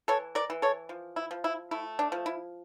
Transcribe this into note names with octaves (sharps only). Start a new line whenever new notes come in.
E3 A4 C#5
A#4 D5
E3
A4 C#5
F3
E4
F3
E4
A3 E4
D4
F3
E4